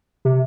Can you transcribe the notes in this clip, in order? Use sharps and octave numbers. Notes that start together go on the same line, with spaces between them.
C3